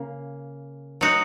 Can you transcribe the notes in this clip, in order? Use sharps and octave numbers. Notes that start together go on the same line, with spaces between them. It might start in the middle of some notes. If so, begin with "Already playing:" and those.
Already playing: C#3 A#3
F#3 D#4 F#4